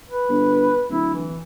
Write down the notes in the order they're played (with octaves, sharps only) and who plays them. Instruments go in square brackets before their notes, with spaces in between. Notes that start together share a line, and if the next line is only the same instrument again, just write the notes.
[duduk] B4
[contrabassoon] G1
[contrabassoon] D1 [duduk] E4
[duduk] E3